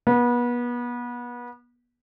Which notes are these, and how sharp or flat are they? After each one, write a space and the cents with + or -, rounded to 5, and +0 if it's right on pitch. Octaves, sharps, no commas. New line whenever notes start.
B3 -30